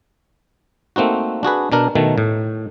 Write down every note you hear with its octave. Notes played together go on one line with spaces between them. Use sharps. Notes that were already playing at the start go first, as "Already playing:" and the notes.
A3 A#3 C4 D#4 F#4
D4 F#4 G#4 B4
B2 D4 A#4
B2 D#3 A3
A2